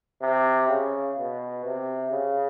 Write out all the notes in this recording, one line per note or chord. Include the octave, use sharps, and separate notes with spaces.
C3
C#3
B2
C3
C#3